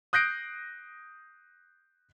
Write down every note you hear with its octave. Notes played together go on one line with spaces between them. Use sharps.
D#6 F#6 G6 A#6 C7 D7